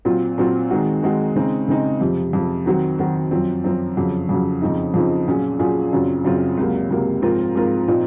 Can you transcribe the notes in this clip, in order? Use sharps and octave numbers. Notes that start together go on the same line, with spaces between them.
A#2 F#3 C4 F4
A#2 F#3 C4 F4
D#3 G#3 C4 D#4 F#4
D#3 G#3 C4 D#4 F#4
C#3 G#3 C4 D#4
C#3 G#3 C4 D#4
F2 C3 F3
F2 C3 F3
D#3 F#3 C4 F#4
D#3 F#3 C4 F#4
F#2 F3 C4
F#2 F3 C4
F2 C#3 F#3
F2 C#3 F#3
F2 C#3 F3 C4 D#4
F2 C#3 F3 C4 D#4
A#2 F#3 C#4 F4 G#4
A#2 F#3 C#4 F4 G#4
F#2 C#3 F#3 C4 F4
F#2 C#3 F#3 C4 F4
C#2 C3 F#3 A#3
C#2 C3 F#3 A#3
G#2 F3 C4 F4 A#4
G#2 F3 C4 F4 A#4
A#2 F3 C4 D#4